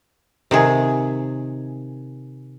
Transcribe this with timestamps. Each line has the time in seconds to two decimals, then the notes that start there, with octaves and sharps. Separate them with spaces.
0.51 C3 D#3 G#4